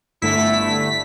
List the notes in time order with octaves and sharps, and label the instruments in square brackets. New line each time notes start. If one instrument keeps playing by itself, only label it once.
[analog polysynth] G1 D3 A3 [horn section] E4 [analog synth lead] B6